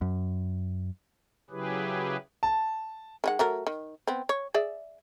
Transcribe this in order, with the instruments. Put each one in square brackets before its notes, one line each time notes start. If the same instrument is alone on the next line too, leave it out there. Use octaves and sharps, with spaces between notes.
[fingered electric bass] F#2
[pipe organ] C#3 F#3 E4 G4 G#4 B4
[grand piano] A5
[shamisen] D#3 G#3 F#5
F#3 A3 A#4
D#3
B3 C4
C#5
G#4 D5 E5